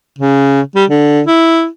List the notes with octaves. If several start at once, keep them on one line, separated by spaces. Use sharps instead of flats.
C#3
G3
D3
E4